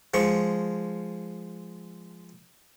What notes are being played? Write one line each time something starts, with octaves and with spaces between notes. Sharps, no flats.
F3 G#3 C#6